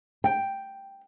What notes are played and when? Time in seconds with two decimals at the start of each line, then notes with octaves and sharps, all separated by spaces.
0.24 G5